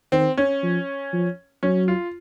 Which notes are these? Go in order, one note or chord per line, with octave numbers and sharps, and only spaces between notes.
D#3 C4
C#4
F3
F3
F#3 C#4
F4